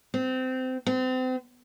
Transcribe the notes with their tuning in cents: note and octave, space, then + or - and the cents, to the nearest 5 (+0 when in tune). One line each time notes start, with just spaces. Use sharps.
C4 -25
C4 -35